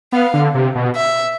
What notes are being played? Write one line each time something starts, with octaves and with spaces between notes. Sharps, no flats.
B3 F5
D3
C3
B2
E5